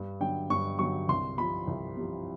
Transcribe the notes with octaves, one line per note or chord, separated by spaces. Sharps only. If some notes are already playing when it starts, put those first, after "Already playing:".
Already playing: G2
D3 F#3 G5
G2 C#6
D3 F#3 C#6
C2 C6
C3 F3 B5
C2
C3 F3